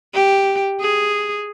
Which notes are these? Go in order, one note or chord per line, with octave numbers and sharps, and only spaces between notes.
G4
G#4